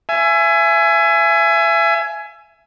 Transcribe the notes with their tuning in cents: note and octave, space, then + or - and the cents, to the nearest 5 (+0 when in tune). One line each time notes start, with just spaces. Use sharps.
E5 +30 G#5 +15